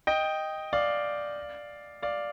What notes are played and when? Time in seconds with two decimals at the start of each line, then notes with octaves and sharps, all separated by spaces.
0.07 D#5 G5
0.73 D5 F5
2.02 D5 F5